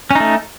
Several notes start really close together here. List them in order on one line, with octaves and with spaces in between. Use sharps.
C#4 D#4 A3